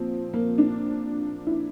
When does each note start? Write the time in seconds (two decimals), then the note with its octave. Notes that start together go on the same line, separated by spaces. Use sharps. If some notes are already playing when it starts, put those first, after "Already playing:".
Already playing: A#2 F3 C4
0.34 A#3
0.58 D4
1.47 E4